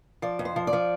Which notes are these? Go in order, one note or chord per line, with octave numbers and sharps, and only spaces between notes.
F3 D5
F2
C5
F3
D5
F3